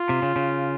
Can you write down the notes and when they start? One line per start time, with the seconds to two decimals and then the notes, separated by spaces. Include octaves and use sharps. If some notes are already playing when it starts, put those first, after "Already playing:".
Already playing: F4
0.09 C3
0.22 C#3
0.36 C#3